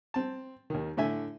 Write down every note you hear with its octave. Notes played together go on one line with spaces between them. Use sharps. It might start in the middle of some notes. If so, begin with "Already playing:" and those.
C4 A5
D#2 D#3
A2 D3 E5 G#5